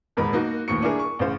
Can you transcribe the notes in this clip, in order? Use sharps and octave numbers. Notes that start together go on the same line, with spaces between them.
D#1 F2 G#2 A#4 B5
A#3 D#4 F#4
D#1 D#2 A2 C#6 C#7
D4 E4 G#4 A#4
C#6
A1 C#3 C5 F5